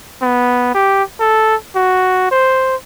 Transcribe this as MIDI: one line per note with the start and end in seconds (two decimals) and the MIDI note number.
0.22 0.72 59
0.74 1.03 67
1.20 1.55 69
1.76 2.27 66
2.31 2.76 72